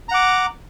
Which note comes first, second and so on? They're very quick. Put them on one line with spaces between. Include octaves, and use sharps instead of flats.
A#5 F#5 D6